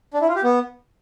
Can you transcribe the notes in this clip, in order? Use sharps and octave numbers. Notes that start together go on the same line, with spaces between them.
D4
E4
F4
G4
B3